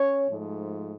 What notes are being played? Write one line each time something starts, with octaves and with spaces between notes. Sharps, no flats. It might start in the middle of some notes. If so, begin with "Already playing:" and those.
Already playing: C#4 C#5
G#2 F3 A3